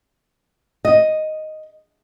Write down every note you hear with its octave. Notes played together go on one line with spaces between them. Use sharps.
D#5